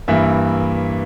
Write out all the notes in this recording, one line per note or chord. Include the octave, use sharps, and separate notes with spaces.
G2 E3 A#3 E5